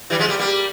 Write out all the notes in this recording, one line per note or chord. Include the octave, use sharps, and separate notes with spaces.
E3 G3
F3 G#3
G3 A#3
G3 A#3